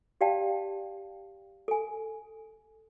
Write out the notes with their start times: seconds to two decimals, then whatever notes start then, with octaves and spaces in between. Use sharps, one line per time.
0.21 G4 D5 F5 G5 A5
1.68 A4 G#5